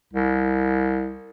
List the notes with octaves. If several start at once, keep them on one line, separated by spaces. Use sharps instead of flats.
C2